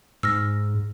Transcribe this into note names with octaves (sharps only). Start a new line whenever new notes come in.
G#2 E6 F6 A#6